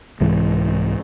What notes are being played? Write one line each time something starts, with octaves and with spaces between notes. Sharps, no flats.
C2 G#2 E3